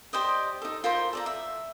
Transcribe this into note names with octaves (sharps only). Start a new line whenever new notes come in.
G4 C5 D5 D#5
D#4 A4
F4 A#4 C5 B5
A4 D5 A#5
E5